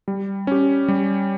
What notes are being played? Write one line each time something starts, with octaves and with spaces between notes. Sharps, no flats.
G3
C#4 G4
G3